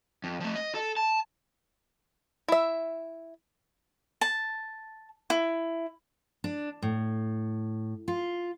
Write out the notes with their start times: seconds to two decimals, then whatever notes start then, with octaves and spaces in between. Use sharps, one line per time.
0.24 F2
0.40 F3 A3
0.55 D#5
0.74 A4
0.97 A5
2.48 E4 E5
4.21 A5
5.30 E4
6.44 D4
6.82 A2
8.08 F4